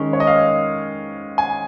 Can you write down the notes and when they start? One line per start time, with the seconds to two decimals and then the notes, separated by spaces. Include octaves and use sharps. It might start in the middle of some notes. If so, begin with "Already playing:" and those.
Already playing: D#3 G#3 C#4
0.13 C#5
0.20 D#5
0.27 F5
1.38 G#5